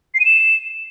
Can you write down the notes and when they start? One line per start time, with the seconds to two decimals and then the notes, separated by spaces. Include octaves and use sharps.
0.14 C7
0.20 D#7
0.25 E7